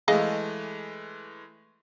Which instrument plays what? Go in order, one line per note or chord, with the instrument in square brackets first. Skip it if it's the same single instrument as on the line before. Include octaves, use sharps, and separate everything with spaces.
[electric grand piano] E3 G#3 A3 [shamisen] G#4 D#5 F5